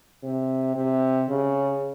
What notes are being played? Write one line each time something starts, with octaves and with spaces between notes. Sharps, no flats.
C3
C3
C#3